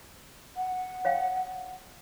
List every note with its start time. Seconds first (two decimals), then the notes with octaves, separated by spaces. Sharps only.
0.57 F#5
1.05 C#5 F5 G5